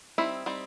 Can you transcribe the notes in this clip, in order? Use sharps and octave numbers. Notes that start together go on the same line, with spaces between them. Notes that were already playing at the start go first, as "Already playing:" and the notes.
G3 C4 D#4 E4
G3 C4 D#4